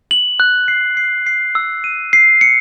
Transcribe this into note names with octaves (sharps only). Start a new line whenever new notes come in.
F#7
F#6
C7
C7
C7
E6
D#7
C7
C#7